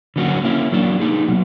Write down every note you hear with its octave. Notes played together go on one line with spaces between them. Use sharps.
D3 F#3 A#3 C#4 F#4
A#3 C#4 E4
F#3 A#3 D4
A#3 D#4 G#4
B2 F#3